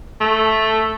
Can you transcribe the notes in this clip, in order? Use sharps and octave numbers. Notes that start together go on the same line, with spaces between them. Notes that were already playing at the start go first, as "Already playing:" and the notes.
A3